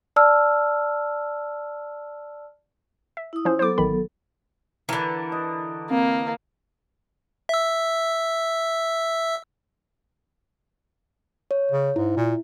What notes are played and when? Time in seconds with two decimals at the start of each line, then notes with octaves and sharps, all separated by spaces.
0.16 D5 A5 E6 F6
3.17 E5
3.33 E4 D#6
3.45 F3 C#4 C5
3.59 F#3 B3 A4 C5 D6
3.78 A1 D#3 B5
4.89 D3 E3 A#4 B4 A5
5.32 D#5
5.91 A#3 C4
7.49 E5 E6
11.51 C#5
11.71 C#3
11.96 G#2 E4
12.17 A#2